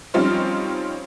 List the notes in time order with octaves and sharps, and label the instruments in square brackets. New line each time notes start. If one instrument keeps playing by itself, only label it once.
[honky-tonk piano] F3 G3 C4 C#4 D#4 F4